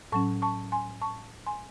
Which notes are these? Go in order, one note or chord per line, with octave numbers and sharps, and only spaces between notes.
A2 F#3 C#4 A5 C#6
A5 C#6
G#5 C6
A5 C#6
G#5 C6